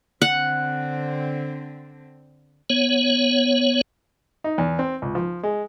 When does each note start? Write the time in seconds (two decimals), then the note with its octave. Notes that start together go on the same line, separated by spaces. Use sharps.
0.22 D3 C4 F#5
2.70 B3 C#5
4.44 D#4
4.58 E2
4.79 C4
5.02 C#2
5.15 F3
5.43 G#3